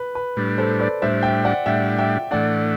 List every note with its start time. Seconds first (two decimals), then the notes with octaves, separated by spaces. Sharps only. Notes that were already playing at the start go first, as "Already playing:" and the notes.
Already playing: B4
0.15 B4
0.37 A2 G3 D4
0.58 A4 C5
0.80 B4 D5
1.02 A2 G3 D4 C5 E5
1.23 E5 G5
1.44 D5 F#5
1.66 A2 G3 D4 E5 G5
1.98 E5 G5
2.31 A2 E3 A3 D4 D5 F#5